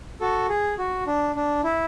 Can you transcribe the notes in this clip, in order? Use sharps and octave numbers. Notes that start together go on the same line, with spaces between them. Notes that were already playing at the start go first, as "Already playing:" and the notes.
F#4 A4
G#4
F#4
D4
D4
E4